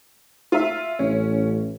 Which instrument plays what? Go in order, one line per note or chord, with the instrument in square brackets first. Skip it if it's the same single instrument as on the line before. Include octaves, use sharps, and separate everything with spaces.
[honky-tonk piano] F4 E5
[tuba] A1 [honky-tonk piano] C#4